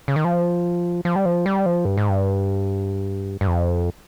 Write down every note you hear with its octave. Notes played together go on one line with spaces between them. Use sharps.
C#3
D#3
F3
F3
G3
F3
G3
F3
G2
G#2
G2
G2
F2